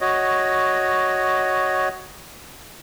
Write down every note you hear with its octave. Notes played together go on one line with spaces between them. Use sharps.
F#4 C#5 D#5